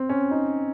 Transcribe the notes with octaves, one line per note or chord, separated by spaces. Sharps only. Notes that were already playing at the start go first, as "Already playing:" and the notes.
Already playing: C4
C#4
D#4